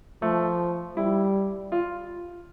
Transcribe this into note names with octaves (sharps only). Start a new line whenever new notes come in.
F3 A3
G3 E4
F4